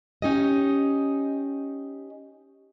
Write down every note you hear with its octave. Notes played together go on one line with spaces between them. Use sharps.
C#4 D#4 G4 D#5